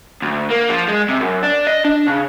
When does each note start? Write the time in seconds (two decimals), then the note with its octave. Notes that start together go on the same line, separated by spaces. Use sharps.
0.22 D2
0.50 A#3
0.69 F3
0.88 G#3
1.09 C3
1.20 F#2
1.43 D4
1.67 D#5
1.84 D4
2.07 C#3